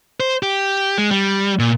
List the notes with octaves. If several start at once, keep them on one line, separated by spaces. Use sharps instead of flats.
C5
G4
G#3
G3
A#2